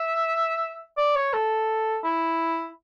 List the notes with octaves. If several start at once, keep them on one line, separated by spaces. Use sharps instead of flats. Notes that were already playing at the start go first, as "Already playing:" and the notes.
Already playing: E5
D5
C#5
A4
E4